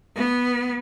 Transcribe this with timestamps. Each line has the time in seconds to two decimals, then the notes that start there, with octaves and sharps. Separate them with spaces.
0.16 B3